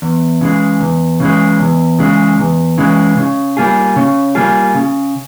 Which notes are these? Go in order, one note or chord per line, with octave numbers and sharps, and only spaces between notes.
E2
C#3 E3 G#3
E2
C#3 E3 G#3
E2
C#3 E3 G#3
E2
C#3 E3 G#3
C#3
G3 A#3 F4 G#4
C#3
G3 A#3 F4 G#4
C#3